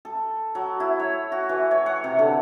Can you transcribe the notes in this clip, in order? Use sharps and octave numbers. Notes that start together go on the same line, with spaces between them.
A4
F#3
E4
C#5
F#4
E3
C#5
F#5
C3
D3